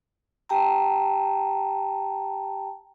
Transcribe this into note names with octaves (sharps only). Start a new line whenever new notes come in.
G4 G5 A5 A#5